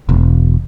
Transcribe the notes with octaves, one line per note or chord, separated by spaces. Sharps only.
E1